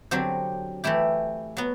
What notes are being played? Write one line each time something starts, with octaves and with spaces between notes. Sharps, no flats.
D3 F#3 C4 G4
E3 A3 E4 G4
F#3 B3